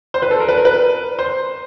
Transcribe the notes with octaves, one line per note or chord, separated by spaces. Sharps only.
C5
B4
A4
A#4
B4
A#4
B4
C5